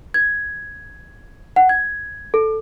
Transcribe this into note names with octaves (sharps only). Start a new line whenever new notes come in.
G#6
F#5
G#6
A4